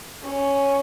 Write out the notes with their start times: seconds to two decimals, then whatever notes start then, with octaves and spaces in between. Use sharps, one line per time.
0.23 C#4